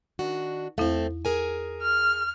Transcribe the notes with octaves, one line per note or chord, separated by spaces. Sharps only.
D#3 D4 F#4
E2 A3 C4 E4
G#4 A#4 G#5
F6